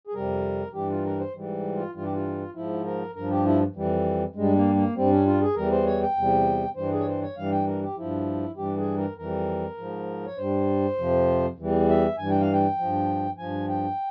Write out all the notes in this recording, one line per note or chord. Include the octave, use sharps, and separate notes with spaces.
G#4
F2 C3 G3 A#4
G2 E3 G3 G4
F4
A#4
C5
G#2 E3 G3
F4
G2 E3 G3 F4
G4
F4
G#2 F3 E4
A#4
G2 F3 A#4
G4
E4
F2 E3 G3
G2 G3 G#3
A#3
A#3
G2 G3 C4
C#4
F4
G#4
E2 E3 G3 A#4
C5
C#5
G5
E2 C3 G3
G2 E3 G3 C5
G#4
C#5
C5
C#5
G2 E3 G3 F5
G5
A#4
G4
G2 F3 E4
G2 E3 G3 G4
G#4
A#4
F2 E3 G3 A#4
G#2 F3
C#5
G2 G3 C5
F2 C3 F3
E2 E3 G3
E5
G2 E3 G3 G#5
G5
F5
G5
G2 F3
G2 F3 G#5
G5